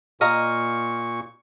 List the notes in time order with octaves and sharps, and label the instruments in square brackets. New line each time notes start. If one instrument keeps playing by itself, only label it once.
[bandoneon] A#2 C#6 [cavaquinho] D#5 F5 A#5